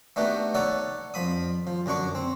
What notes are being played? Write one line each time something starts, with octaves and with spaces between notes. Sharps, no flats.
A3 B3 D4 D#4 F#4 G4
D#4 A4 C#5 D5 F#5
F2 F3 B5 D#6
F3
F#2 D3 D4 C#6 D6
C4